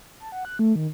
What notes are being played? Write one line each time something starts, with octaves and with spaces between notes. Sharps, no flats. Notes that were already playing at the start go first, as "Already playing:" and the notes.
A5
F#5
F#6
A3
D#3